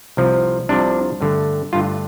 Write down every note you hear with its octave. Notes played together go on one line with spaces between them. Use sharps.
C2 C3 F3
C2 C3 F3 D4
G2 D3 A3
G2 D3 A3 F4